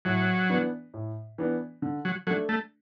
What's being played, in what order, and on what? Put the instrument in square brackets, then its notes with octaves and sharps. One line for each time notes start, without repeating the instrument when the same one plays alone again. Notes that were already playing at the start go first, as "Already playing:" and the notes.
[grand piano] A2 [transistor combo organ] F#3
[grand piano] E3 B3 D4
A2
E3 B3 D4
D3
[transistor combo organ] F#3
[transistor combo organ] F#3 [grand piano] A3 D4
[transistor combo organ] A3